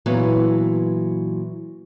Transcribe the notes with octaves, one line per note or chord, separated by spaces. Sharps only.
A#2 E3 F#3 B3